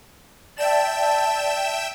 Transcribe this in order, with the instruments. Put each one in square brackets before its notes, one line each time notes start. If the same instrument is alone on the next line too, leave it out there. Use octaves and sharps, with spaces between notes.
[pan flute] D5 [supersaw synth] E5 G5 E7 [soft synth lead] A5